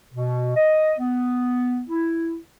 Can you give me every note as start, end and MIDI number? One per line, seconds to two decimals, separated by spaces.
0.14 0.52 47
0.56 0.94 75
0.99 1.83 59
1.89 2.37 64